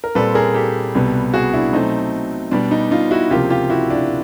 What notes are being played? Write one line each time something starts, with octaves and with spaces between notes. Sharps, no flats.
A#4
A#2 G3 C4 A4 B4
G#4 A#4
G4 A4
C2 B2 G3 B3
F#4 G#4
D4 E4
B2 F#3 A3 C4 D#4
B2 G3 B3 D4
D#4
D#4 F4
E4 F#4
C#2 C3 F3 A#3 F4 G4
F4 G4
E4 F#4
D4 E4